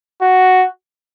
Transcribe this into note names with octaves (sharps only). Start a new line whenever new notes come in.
F#4